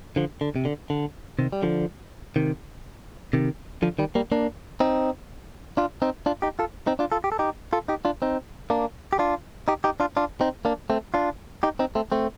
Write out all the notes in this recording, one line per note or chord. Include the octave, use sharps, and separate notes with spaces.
D3 F3
D3
C3
D3
D3
C3 D#3
G3
D3 F3
C3 D#3
C3 D#3
D3 F3
D#3 G3
G3 A#3
A#3 D4
C4 D#4
D4 F4
C4 D#4
D4 F4
D#4 G4
F4 A4
C4 D#4
D4 F4
F4 A4
G4
A4
D#4 G4
F4 A4
D#4 G4
D4 F4
C4 D#4
A#3 D4
G4
D4 F4
D#4 G4
D#4 G4
D4 F4
D4 F4
C4 D#4
A#3 D4
A3 C4
D4 F4
D#4 G4
C4 D#4
A3 C4
A3 C4